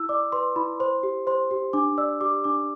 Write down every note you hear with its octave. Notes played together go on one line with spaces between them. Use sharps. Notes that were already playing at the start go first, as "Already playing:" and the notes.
Already playing: E4 E6
D5 D6
B4 C6
E4 B5
C5 C6
G4
C5 C6
G4
D4 D6
D5 E6
G4 D6
D4 D6